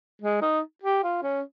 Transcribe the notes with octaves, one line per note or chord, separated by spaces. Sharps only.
G#3
D#4
G4
F4
C#4